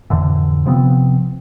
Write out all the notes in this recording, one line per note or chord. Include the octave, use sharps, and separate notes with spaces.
F2 A2 D3 E3
C3 F3 B3 C4